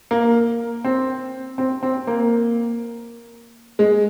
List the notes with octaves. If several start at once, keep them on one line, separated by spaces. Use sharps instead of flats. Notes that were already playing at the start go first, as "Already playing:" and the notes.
A#3
C4
C4
C4
A#3
G#3